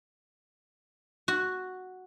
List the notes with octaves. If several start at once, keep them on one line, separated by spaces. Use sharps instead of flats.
F#4